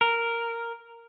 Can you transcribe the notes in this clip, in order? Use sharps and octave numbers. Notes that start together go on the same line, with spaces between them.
A#4